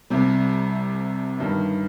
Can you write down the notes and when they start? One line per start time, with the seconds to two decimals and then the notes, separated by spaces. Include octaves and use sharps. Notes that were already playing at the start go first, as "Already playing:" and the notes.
0.10 C2 C3 G3
1.38 G1 G2 D#3